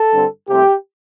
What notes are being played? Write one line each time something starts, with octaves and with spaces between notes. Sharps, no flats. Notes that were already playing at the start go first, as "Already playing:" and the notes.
Already playing: A4
G2 D3 C4
C2 C3 A3 C4 G4